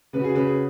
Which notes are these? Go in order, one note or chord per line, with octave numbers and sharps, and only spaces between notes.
C#3 B4
F#4
G#4
C#3 B4
G#4